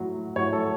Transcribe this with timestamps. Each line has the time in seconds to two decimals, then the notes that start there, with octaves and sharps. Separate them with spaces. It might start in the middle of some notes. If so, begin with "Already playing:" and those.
Already playing: A2 F#3
0.36 A2 F#3 C#5
0.53 A4